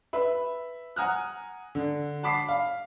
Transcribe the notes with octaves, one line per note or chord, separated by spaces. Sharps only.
B4 E5 B5
F#5 G#5 A#5 D#6 F6 F#6
D3
F#5 A5 B5 D6 B6 C7
F5